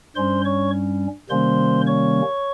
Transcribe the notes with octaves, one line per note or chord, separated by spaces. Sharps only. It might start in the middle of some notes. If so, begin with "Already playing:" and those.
G2 G3 C#4 C5 C6
C#5 C#6
C3 D#3 G3 A#3 C#4 C5 C6
C#5 C#6